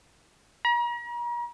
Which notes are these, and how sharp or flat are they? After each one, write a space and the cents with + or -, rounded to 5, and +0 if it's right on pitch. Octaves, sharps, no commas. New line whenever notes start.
A#5 +40